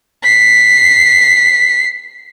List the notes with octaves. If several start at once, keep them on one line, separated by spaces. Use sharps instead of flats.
B6 C7